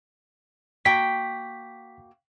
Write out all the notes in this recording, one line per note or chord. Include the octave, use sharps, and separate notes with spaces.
A#3 F#4 G5 B6